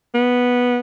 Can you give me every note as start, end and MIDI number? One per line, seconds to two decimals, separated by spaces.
0.14 0.79 59